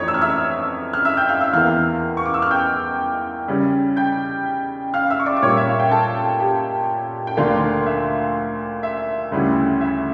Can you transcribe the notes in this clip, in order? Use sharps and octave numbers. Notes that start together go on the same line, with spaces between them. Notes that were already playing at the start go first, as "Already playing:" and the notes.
Already playing: F2 E3 A3 D4 C#5 A#5 C#6
E6
F6
E5 E6
F6
E5 E6
G5 G6
F5 F6
E5 E6
E2 E3 A#3 F5 F6
C#6
D6
E6
F6
G5 G6
C#3 G3 C#4
G5 G6
F5 F6
E5 E6
C#6
D5 D6
D6
A#2 G3 A#3 C#5 C#6
E5
F5
G5
A4 A5
G4 G5
G5
D2 D3 F3 A#3 D4 F4 F5
E5
E5
D2 C#3 G3 C#4 E4
E5